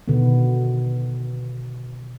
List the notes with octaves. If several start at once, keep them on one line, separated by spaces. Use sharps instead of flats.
B2 D3 D#3 B3